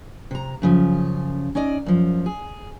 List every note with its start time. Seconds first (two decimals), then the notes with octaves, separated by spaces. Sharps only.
0.31 C3 A#5
0.62 F#2 C#3 F3
1.55 C#4 D#4 D5 D#5
1.86 F#2 F3
2.26 G#4